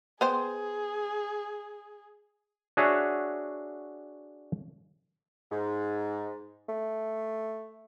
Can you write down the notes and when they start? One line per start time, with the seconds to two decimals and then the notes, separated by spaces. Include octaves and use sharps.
0.21 B3 G#4 C5 G5
2.77 D4 F#4 G#4 C#5 E5 F#5
5.51 G#2
6.69 A3